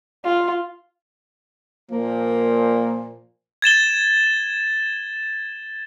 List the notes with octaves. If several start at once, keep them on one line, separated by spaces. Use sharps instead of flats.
F4
A#2 F3 A#3
G#6 A6 E7 G7